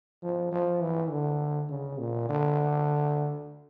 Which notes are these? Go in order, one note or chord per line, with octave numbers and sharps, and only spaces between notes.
F3
F3
E3
D3
C#3
A#2
D3